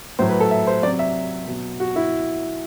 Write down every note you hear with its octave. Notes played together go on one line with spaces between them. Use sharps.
A2 F#3 C5
B4
A4
E5
C5
C3 F#3 D5
E5
B2 F#3
F#4
E4